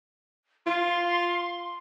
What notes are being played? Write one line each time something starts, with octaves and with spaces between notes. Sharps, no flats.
F4 C6